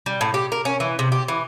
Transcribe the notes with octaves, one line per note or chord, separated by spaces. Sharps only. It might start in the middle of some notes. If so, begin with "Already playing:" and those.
G3
A2
G4
A#4
C#4
E3
C3
G4
E3